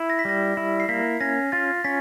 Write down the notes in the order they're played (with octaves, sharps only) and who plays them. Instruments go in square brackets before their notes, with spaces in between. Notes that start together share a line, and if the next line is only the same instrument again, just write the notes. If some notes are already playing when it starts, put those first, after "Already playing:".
Already playing: [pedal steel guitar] E4
[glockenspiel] A#6
B6
[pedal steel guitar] G3 [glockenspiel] A#6
[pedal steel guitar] E4
[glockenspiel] C7
[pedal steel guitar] A#3 [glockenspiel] B6
[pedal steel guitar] C#4 [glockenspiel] A#6
[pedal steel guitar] F4 [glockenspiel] A6
[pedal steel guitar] C#4 [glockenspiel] B6